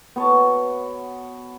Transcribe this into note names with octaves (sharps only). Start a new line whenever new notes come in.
B3 F#4 C#5 A5